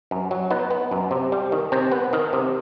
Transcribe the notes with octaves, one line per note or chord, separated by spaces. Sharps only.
F#2
F#3
B3 D#4
B3
F#2
C3
G3
D#3
C3 C4
B3
D#3
C3